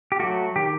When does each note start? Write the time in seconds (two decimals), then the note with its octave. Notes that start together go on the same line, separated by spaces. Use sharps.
0.12 G4
0.20 F#3 A3 F#4
0.56 D#3 G4